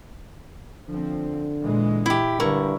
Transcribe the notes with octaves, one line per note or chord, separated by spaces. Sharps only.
D3 F3 C4
A#2 E3 G#3
E4 G4
G2 D3 E4 A#4 C#6